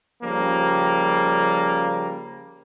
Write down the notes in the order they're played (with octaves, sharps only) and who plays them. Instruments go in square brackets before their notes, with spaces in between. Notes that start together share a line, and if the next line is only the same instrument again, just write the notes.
[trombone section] C#3 F3 G3 A#3